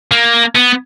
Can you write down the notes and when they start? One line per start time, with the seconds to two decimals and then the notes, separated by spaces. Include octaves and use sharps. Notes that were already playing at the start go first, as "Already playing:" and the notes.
0.11 A#3
0.56 B3